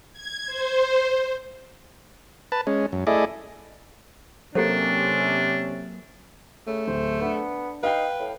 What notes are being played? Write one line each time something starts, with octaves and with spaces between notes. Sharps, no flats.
G#6
C5
B4 A5
G#3 C#4
F#2
A3 E4 G#4 D5 D#5
C3 F#3 A#3 C#4 D4 G4 A4 C5
C#3 A3
D1 C5
B3 D4
D#4 B4 F5 G5 C7
A2